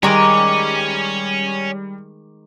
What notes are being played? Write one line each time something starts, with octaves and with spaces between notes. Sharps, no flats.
D#3 G3 G#3 C#5 G#5 A#5 D6